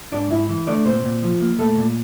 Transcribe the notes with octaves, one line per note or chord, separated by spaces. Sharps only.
G#2 D4 D5
G#2 E4 E5
E3
A3 D4 D5
A#2 C4 C5
A#2
F3
A#3
A#2 A3 A4
A#2